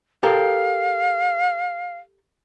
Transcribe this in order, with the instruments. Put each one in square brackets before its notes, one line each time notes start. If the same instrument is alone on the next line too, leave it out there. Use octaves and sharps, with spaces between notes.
[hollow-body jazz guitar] G4 A4 A#4 [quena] F5